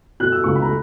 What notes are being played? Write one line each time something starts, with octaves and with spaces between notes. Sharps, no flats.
B2 F#6
E6
C#2 C#6
B5
A#5